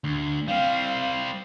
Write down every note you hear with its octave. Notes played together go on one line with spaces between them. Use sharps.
D2
G3 C4 F5